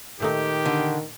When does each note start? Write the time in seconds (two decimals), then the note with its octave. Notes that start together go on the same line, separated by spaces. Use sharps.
0.20 A#2 D#3 A3 D#4 G4
0.65 D3